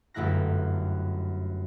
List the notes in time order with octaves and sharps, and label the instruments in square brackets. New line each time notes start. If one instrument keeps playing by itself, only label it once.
[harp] G1 F#2 A3 E4 F#6 A#6